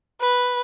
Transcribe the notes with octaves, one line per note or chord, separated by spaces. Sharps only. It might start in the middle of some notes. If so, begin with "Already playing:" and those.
B4